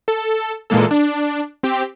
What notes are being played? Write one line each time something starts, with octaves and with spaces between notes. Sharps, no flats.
A4
A#2 E3 G#3 A#3 A4
D4
C4 G4